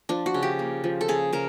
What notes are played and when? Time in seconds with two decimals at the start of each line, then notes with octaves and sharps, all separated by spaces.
0.09 F3 D4
0.26 F#4
0.34 C#3
0.43 G4
0.59 A#3
0.84 F3
1.01 A4
1.08 C#3 G#4
1.33 C#3 A#4